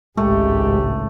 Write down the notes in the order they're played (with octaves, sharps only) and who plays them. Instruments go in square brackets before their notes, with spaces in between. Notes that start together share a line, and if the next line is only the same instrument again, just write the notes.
[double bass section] G#1 C#2 A2 [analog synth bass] G#3 [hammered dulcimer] A3 [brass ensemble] G4